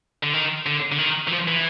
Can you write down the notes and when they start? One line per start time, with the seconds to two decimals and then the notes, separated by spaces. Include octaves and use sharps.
0.23 D3
0.33 D#3
0.66 D3
0.92 D3
0.98 D#3
1.27 E3
1.32 F3
1.48 E3